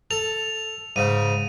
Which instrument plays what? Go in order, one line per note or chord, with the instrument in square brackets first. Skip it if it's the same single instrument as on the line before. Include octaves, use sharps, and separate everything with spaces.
[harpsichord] A4 [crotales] F7
[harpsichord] G#2 C#3 [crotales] D#7